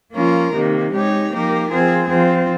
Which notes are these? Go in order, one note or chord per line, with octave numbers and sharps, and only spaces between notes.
F3 A#3 C#4 F4 A#4
C3 D#3 A#3 D#4
G#3 D#4 G4 C#5
F3 A#3 D#4 G4 A#4
F3 C4 F4 G#4
F3 C4 F4